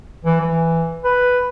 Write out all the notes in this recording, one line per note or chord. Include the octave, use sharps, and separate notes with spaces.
E3
E3
B4